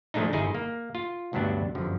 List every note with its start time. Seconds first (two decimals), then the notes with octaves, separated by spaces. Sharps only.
0.14 D#3 F3 G#3 A3 D4 D#4
0.33 G1 D#4 E4 G#4
0.55 A#3
0.95 F4
1.33 D2 G2 F#3 B3 D4
1.75 G1 F#2 D3 F3